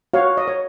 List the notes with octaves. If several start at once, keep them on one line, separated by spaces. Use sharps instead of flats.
F#4 C#5 F5
D#5
C#5